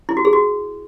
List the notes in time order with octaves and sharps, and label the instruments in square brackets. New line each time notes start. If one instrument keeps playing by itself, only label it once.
[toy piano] E4
F#4
G#4
F#4